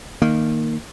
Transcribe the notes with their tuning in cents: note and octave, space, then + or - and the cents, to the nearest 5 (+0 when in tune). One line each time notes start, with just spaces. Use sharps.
D#3 -10 A#3 -15